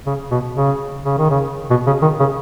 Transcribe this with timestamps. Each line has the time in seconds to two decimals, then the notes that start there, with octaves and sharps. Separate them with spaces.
0.06 C#3
0.31 B2
0.56 C#3
1.05 C#3
1.18 D#3
1.30 C#3
1.70 B2
1.86 C#3
2.02 D#3
2.19 C#3